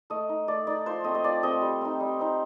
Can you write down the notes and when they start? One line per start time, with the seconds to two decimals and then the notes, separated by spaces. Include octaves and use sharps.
0.10 A3 D#5
0.29 D#4
0.48 A3 D5
0.67 D#4 D5
0.86 F3 C5
1.04 A3 C4 D#5
1.15 D#5
1.24 F3 D5
1.43 A3 C4 D#5
1.61 G3
1.81 C4 D#4
2.00 G3
2.19 C4 D#4